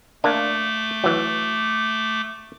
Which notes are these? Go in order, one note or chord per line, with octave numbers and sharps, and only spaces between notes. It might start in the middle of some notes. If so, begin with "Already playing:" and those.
A3 A#3 D4 D6
E3 F#3